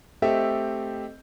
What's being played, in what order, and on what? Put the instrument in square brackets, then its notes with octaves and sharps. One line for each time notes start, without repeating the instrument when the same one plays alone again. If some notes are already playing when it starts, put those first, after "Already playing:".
[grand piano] A3 C4 G4 A4 D#5 E5